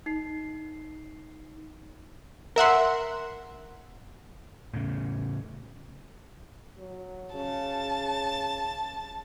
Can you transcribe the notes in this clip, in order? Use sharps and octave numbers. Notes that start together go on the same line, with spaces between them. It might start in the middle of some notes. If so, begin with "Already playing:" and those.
D#4 C7
A#4 E5 F#5 C6
A2 C#3
F#3
C#3 A5